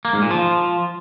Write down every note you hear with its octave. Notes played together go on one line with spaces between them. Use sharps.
A#3
G#2
A#2
F3